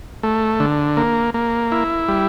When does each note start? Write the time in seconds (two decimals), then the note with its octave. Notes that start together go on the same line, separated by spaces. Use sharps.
0.23 A3
0.60 D3
0.97 A#3
1.34 A#3
1.72 E4
2.08 G3